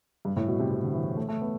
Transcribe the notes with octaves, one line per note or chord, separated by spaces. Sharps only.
G2
A2
B2
C3
C3
D3
E3
A3
A3
B3